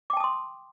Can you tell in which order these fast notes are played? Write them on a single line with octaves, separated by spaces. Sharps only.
D6 G5 A5 D#6 C6